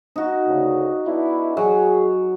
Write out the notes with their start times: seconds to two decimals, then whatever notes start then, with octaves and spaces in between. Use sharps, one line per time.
0.16 D#4 F#4
0.48 D2 C#3
1.07 B3 D4 E4
1.57 F#3 G#4